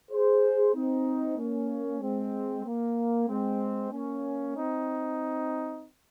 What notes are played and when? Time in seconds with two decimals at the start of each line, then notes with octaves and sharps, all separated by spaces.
0.11 G#4 C5
0.74 C4 D#4
1.37 A#3 C#4
2.01 G#3 C4
2.65 A#3
3.28 G#3 C4
3.91 A#3 C#4
4.55 C4 D#4